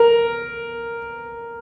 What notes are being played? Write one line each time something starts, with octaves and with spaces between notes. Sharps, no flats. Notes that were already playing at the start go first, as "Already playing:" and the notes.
Already playing: A#4